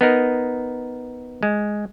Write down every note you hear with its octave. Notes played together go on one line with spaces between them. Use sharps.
B3 D#4 A#4
G#3